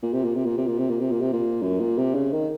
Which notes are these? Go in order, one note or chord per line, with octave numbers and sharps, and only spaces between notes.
A#2
C3
A#2
C3
A#2
C3
A#2
C3
A#2
C3
A#2
C3
A#2
F#2
A#2
C3
C#3
D#3